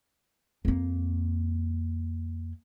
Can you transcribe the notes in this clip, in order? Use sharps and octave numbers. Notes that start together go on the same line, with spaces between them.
F2 A#3